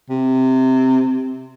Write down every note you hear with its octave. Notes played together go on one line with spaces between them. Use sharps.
C3